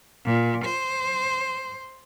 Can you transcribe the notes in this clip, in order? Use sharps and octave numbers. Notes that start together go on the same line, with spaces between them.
A#2
C5